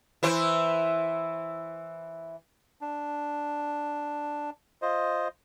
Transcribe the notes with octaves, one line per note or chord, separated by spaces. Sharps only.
E3 E4 C5
D4
F4 C5 D#5